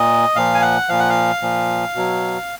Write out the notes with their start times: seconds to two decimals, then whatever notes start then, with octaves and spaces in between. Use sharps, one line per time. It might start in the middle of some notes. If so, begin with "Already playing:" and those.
Already playing: A#2 D#5
0.35 A#2 F3 F5
0.54 G#5
0.62 F#5
0.89 A#2 F3 F5
0.99 F#5
1.10 F5
1.42 A#2 F3
1.95 B2 F#3